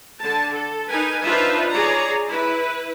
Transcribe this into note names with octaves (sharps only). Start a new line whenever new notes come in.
D3 A5
A4
D#4 A#4 B4 G#5
D4 D#4 F4 B4 C5 E5
G#4 C#5 D5 A#5
E4 B4